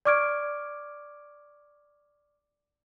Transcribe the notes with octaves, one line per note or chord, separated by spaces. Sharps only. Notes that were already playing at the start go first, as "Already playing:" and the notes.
D5 C#6 D6 F6 G#6 D7